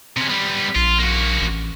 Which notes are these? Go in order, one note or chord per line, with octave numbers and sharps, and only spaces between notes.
C3 C#4
G3 B3
A#1 F4
A#3 F#4
A1